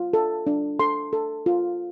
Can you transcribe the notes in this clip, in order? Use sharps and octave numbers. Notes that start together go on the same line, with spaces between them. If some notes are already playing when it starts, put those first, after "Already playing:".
Already playing: F4
A4
D4
A4 C6
A4
F4